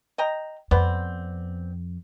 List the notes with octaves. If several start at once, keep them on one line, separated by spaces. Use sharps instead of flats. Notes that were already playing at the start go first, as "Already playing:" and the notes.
D#5 G5 A#5
F2 B3 C4 D5